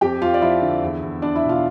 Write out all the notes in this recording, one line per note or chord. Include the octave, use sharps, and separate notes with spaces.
F2 G4 G5
F2 F4 F5
D5
F3 E4 E5
D3
E2
E2
B3 D4 D5
E4 E5
B2
F4 F5